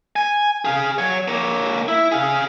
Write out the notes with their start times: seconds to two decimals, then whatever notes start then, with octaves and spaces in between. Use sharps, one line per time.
0.16 G#5
0.65 G#4 F5
0.98 F#3 C#5
1.28 A#3 C#5
1.88 E4
2.12 G#4 F5